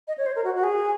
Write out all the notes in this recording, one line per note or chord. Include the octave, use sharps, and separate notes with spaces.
D#5
C#5
C5
A#4
F#4
F#4
G#4